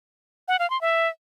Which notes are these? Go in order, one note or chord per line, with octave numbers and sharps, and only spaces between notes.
F#5
F5
C6
E5